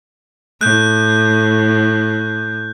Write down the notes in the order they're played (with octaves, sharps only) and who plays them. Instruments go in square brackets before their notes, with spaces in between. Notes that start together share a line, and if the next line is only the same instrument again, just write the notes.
[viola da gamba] A2 [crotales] F#6 G6